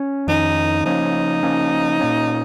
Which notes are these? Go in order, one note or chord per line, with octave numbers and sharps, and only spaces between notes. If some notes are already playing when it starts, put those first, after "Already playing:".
Already playing: C#4
F2 D#3 A#3 C#4 D#4
C#3 F3 A#3 C#4 D#4
C#3 F3 A#3 C#4
A#2 A#3 C#4